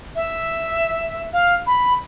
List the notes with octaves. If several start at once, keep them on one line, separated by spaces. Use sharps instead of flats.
E5
F5
B5